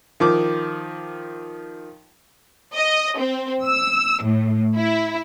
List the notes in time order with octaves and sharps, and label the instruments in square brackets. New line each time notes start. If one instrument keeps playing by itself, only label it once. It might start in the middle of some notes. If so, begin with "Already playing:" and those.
[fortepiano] D#3 F3 D6
[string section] D#5
C4
E6
A2
E4